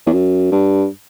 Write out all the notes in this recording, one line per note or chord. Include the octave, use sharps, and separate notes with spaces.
E2
F#2
G2